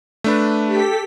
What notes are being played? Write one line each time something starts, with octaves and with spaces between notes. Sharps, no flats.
A3 D4 B4
G4 A4 B6